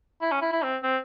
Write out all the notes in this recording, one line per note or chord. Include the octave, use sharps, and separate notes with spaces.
E4
C#4
E4
E4
C4
C4